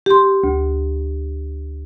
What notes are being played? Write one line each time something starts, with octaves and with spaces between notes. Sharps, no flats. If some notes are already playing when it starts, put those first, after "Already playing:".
G4 C6
D2